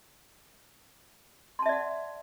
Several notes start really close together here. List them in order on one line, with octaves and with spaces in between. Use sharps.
C6 A5 E5 D5 F#5